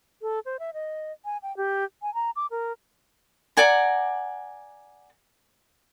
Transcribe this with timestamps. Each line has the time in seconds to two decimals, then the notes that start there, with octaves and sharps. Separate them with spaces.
0.22 A4
0.45 C5
0.59 E5
0.74 D#5
1.25 G#5
1.43 G5
1.57 G4
2.02 G#5
2.14 A#5
2.36 D6
2.51 A#4
3.57 D5 F#5 G#5 A#5